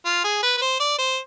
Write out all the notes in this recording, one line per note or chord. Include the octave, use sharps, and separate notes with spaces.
F4
G#4
B4
B4
C5
D5
C5